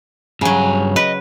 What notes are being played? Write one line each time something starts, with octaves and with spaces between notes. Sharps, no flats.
G2 C#3 F#3 G#5
B4 D#5